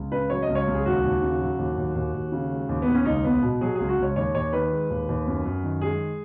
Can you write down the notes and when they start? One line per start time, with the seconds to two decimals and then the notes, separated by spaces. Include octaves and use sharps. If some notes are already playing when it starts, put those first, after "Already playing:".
Already playing: C#2
0.12 C#3 B4
0.30 F#3 C#5
0.42 D#5
0.49 C#2
0.55 C#5
0.67 C#2
0.74 G#4
0.86 D#2 F#4
1.04 D#2
1.22 C#3
1.41 F#3
1.58 D#2
1.77 D#2
1.95 D#2
2.14 D#2
2.32 C#3
2.50 G#3
2.69 D#2
2.82 B3
2.88 D#2
2.94 C#4
3.05 C#2 D#4
3.24 C#2 B3
3.42 B2
3.61 F#3 G#4
3.75 C#2 G#4
3.89 F#4
3.98 C#2 C#5
4.16 D#2 C#5
4.35 D#2 C#5
4.53 D#3 B4
4.71 G#3
4.90 D#2
5.08 D#2
5.27 F#2
5.45 F#2
5.63 D#3
5.81 G#3 G#4